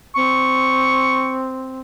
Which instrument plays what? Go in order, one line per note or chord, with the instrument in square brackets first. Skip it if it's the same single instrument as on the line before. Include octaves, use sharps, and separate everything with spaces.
[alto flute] C4 [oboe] C#6